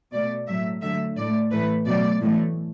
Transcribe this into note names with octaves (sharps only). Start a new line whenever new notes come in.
B2 A3 D5
A2 F#3 A3 E5
D3 F#3 A3 E5
A2 A3 D5
A2 E3 A3 B4
B2 F#3 A3 D5
A2 E3 A3